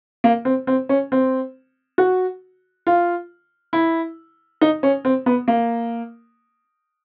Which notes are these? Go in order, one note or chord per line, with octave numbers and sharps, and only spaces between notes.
A#3
C4
C4
C#4
C4
F#4
F4
E4
D#4
C#4
C4
B3
A#3